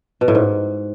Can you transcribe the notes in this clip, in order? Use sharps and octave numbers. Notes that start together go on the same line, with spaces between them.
B2
A2
G#2